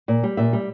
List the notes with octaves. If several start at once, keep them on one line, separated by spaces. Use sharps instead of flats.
A#2
G3
A#2 E5
G3